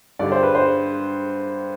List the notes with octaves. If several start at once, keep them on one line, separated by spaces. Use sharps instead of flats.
G2 D3 G3 D5
C5
B4
C5